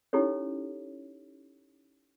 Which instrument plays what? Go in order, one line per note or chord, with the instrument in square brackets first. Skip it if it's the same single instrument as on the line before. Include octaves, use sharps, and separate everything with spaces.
[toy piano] C#4 D#4 E4 G4 A4 C#5